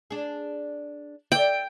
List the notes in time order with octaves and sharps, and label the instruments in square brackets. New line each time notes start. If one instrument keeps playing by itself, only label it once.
[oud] D4 G#4
[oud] A4 D5 [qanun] G5